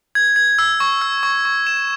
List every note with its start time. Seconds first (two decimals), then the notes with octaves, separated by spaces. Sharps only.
0.15 G#6
0.36 G#6
0.59 E6
0.80 C#6
1.02 E6
1.23 C#6
1.45 C#6
1.67 E7